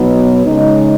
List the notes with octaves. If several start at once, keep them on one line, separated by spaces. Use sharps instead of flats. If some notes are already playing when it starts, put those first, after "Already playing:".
Already playing: B2 F#3 B3 D#4
C#3 G#3 D#4